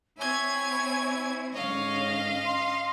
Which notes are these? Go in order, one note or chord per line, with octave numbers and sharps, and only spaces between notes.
C4 E4 C#5 G#5 G#6
G#2 D3 C#4 C#5 D#5 F5
C6